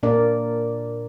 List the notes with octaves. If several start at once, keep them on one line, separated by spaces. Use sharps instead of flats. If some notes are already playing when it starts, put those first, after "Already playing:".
A#2 A#3 D4 A#4 D5